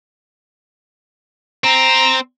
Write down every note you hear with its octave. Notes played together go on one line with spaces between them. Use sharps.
C4 A#5